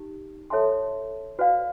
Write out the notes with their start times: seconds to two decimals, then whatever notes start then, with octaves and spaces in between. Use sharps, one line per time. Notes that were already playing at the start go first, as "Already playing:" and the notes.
Already playing: D#4 G4
0.50 A4 C#5 E5 A5 C6
1.39 F#4 B4 D5 F5